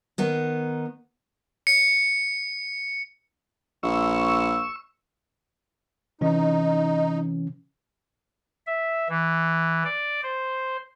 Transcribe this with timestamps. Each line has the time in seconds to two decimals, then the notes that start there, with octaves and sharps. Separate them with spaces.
0.18 D#3 B3 D#4
1.67 C#7
3.83 A#1 C#6 E6
6.21 C3 E3 C#4 D#4
8.67 E5
9.09 E3
9.84 D5
10.23 C5